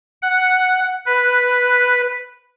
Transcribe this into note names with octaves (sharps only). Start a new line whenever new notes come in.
F#5
B4